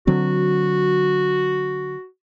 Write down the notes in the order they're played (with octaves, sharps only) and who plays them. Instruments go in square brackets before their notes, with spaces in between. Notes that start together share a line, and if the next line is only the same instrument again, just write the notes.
[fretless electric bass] D3 F#3 C4 [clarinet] F#4